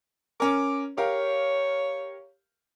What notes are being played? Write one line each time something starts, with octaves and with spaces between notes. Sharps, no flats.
C#4 A#4 D6
G4 A#4 C#5 F5